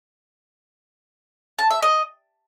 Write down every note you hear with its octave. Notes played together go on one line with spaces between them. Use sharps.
A5
E5
D#5